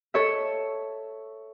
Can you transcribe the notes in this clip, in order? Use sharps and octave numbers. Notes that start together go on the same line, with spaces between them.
A4 C#5 E5